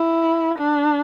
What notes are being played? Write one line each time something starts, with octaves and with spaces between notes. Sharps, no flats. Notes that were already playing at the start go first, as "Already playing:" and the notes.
Already playing: E4
D4